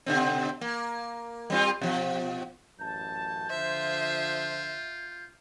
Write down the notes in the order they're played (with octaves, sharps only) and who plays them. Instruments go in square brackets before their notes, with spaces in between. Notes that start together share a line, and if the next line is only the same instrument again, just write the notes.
[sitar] B2 D3 C4
A#3
G3 C4 F4
B2 F3
[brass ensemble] A1 F#2 A5 [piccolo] G6
[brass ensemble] D3 F3 C5 [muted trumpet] F4 [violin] E5